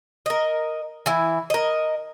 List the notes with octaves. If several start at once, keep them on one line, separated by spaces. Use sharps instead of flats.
A#4 D#5
E3 E4
A#4 D#5